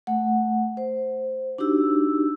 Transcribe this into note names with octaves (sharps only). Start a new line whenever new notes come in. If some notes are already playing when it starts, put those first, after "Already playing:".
A3 F#5
C5
D4 D#4 F#4 G4 E6